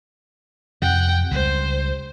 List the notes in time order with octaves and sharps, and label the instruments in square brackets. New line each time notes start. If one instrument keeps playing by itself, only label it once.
[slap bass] F2 C3 [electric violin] F#5 G5
[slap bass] C#2 G3 [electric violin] C5